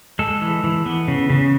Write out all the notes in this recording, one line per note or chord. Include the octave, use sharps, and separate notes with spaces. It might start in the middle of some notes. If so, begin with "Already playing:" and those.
G#3 A4
E3
E3
B3
C#3
C#3